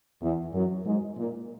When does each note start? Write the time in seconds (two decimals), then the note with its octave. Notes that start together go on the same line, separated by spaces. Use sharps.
0.22 E2
0.53 F#2
0.85 G#2
1.17 A#2